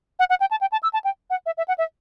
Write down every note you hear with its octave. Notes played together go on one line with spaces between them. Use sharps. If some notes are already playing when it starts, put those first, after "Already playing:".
F#5
F#5
G5
A5
G5
A5
E6
A5
G5
F#5
E5
E5
F#5
E5